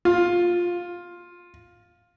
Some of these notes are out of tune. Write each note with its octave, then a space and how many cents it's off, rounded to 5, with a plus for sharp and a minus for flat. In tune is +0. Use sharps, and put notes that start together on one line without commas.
F4 +10